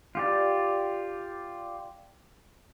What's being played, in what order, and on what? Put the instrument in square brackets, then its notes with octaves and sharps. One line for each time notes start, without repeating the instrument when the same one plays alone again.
[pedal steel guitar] F4 G4 D5